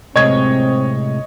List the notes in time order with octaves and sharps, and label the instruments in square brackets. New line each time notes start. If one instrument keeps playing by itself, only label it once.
[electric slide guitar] A2 C3 G#3 [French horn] C4 [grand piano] C#5 D#5 G#6